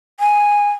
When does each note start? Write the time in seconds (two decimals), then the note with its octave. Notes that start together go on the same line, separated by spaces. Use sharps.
0.20 G#5